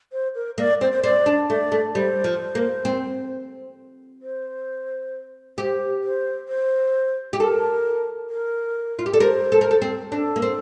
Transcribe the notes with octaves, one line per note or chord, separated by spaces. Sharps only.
C5
A#4
A#3 D5
C4 C5
C5
C4 D5
D4
A3 D5
A3
G3 C5
F3
A#3
C4
C5
G4 C5
C5
C5
G4
A4 A#4
A#4
F4
G4
A4 D5
A#4 C5
A4
A#4
A4
C4
D4 A4
A#3
C4